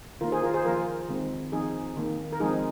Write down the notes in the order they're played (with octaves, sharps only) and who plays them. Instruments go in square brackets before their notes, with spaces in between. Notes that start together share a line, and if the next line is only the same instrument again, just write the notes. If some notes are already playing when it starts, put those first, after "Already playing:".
[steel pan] D#3 A#3 F4 A#4
G#4 C5
F4 A#4
G#4 C5
F3 A#3 F4 A#4
D#3 G#3 C4
F3 C4 D#4 G#4
D#3 A#3
A#4
F3 G#3 C4 D#4 G#4